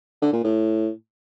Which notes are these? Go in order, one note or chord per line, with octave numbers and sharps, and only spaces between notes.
D3
A#2
A2